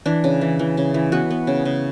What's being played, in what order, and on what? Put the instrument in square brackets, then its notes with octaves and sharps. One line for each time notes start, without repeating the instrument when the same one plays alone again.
[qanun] E3 D4
C#3
E3
E3
C#3
E3
B3 F#4
B3
C#3
C#3